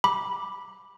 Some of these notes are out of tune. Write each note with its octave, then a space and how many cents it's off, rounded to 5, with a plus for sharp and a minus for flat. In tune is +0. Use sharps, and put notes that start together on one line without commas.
B5 -15 D6 +0